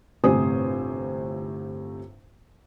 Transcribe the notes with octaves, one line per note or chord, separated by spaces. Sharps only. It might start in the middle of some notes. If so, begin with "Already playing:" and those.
G1 A2 C3 C5 G#5 D#6